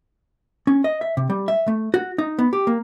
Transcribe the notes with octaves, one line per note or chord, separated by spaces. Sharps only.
C#4
D#5
E5
C3
G3
E5
A3
F#4
D#4
B3
G4
A#3